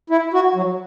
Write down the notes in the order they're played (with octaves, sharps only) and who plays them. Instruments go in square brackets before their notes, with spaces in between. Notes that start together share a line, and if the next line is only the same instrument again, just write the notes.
[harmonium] E4
F#4
F#3